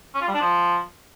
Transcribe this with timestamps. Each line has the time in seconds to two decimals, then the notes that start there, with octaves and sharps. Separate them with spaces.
0.15 C#4
0.21 F4
0.28 G3
0.34 D4
0.41 F3